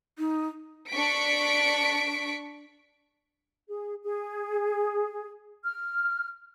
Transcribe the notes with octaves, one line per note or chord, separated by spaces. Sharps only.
D#4
D4 C#6 B6 D7
G#4
G#4
F6